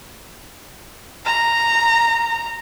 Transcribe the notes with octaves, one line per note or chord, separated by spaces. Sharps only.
A#5